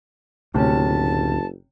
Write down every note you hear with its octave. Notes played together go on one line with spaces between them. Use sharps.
F#1 D2 A2 C3 C#4 A5